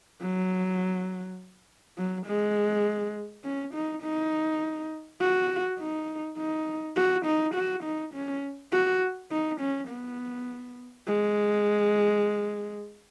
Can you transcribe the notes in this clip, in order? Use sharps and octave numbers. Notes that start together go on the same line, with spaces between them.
F#3
F#3
G#3
C#4
D#4
D#4
F#4
D#4
D#4
F#4
D#4
F#4
D#4
C#4
F#4
D#4
C#4
B3
G#3